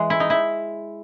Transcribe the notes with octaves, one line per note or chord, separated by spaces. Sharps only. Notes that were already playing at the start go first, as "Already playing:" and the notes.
Already playing: E3 G#3
E4
D#4
E4